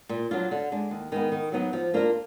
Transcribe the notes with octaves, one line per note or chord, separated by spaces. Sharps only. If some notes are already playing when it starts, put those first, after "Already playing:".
A#2
F#3 D4 F4
D3
G#3 D4
D#2
D#3 G#3 B3
D#3
F#3 B3 D#4
F3
A#3 D4 F4 A#4